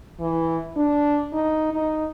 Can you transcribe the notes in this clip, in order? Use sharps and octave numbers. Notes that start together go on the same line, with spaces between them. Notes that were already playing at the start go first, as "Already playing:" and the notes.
E3
D4
D#4
D#4